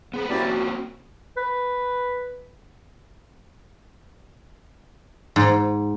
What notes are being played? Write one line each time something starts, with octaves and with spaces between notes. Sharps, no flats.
B3 C4 G#4 B4
A#3 C4 C#4 E4 F#4 G4 D5
F3
B4
G#2